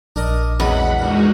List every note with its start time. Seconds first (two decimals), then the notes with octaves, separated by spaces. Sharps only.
0.16 A#1 D4 A#4 D#5
0.60 E2 G#2 F#3 G#3 F#5 B5
0.99 G2 A#2 G#3 D#4 F#4